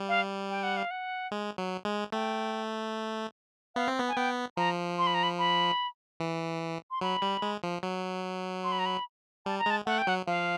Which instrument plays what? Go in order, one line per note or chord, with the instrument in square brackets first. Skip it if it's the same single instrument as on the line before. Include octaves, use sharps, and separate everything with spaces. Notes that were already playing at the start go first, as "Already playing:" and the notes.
Already playing: [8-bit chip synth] G3
[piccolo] F5
G5
F#5
F5
F#5
[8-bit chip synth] G#3
F#3
G#3
[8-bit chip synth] A3 [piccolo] G5
[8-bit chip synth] B3 [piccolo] F5
[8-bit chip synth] C4
B3
[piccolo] G#5
[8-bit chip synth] B3 [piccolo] G5
[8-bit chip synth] F3 [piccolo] A#5
[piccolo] C6
B5
A#5
B5
B5
[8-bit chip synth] E3
[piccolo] C6
[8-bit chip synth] F#3 [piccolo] B5
[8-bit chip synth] G3
G#3
F3
F#3
[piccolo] C6
B5
A#5
B5
[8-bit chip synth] G3 [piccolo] A5
[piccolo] A#5
[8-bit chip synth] G#3 [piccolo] A5
[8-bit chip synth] A3 [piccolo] F#5
[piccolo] G5
[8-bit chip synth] F#3 [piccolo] F#5
[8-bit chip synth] F3 [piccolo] F5